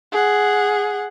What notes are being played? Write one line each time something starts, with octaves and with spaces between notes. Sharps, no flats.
G#4 F#5